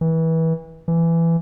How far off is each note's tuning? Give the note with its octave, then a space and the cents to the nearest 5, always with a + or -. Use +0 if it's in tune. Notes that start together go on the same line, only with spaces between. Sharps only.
E3 -25
E3 +15